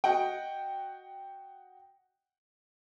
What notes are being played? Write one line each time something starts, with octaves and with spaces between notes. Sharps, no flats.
F#4 D#5 F#5 G5